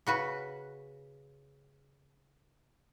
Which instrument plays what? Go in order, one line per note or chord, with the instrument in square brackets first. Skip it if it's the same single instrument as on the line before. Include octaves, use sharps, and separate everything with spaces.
[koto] C#3 F#4 B4